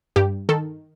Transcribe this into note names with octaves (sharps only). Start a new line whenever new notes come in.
G2 G4
D#3 A4